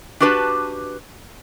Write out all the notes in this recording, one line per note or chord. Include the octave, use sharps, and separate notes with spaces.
D4 F#4 G4 B4 A5